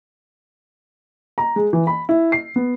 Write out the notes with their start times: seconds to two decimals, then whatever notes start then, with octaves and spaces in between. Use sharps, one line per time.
1.38 A#5
1.56 G#3
1.73 E3
1.87 B5
2.09 E4
2.32 C7
2.56 B3